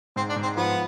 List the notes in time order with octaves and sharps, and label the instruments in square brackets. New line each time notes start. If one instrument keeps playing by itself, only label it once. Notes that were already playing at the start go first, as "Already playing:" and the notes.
[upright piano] G#2 [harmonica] C4
[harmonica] D4
[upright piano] G#2
[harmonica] C4
[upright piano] F3 [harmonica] B3